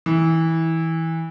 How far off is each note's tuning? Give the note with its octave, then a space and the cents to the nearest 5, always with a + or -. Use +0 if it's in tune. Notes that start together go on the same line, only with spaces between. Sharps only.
E3 -20